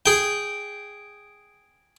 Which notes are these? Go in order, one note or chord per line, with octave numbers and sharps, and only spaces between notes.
G#4 G5